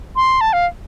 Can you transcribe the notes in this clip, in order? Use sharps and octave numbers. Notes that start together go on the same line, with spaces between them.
C6
A5
F5